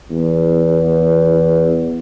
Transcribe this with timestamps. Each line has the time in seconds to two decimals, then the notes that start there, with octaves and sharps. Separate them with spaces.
0.11 E2